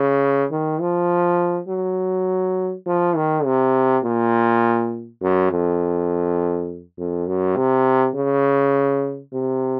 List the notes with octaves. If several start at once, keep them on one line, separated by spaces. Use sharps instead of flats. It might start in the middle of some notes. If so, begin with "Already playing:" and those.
Already playing: C#3
D#3
F3
F#3
F3
D#3
C3
A#2
F#2
F2
F2
F#2
C3
C#3
C3